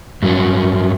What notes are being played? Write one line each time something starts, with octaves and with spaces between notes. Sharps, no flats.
G2 F#3 C#4